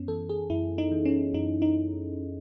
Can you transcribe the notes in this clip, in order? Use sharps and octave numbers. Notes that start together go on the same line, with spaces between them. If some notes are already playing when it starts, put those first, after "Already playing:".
Already playing: F#2 B3 C#4
E3 A4
G#4
F#2 E4
D#4
E3
C#4
F#2 D#4
D#4